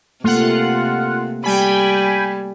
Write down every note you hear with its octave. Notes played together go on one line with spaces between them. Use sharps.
C3 A3 A#3 F4 F#5
G3 G5 G#5 B5